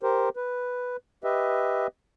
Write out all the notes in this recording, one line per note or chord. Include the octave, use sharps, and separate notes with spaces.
G4 A#4 C5
B4
G4 B4 D#5 E5